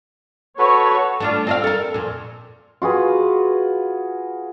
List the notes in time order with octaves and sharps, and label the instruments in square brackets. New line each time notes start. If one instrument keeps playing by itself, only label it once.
[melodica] F#4 A4 B4 [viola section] C#5
[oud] A3 D4 F4
C4 D#5 F5
A4 A#4
F2 A#2
[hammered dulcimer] F4 F#4 G#4 B4